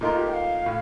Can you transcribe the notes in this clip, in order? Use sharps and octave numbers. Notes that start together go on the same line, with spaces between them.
A#2 A3 D#4 F4 A#4
F4
G4
G5
F5
A2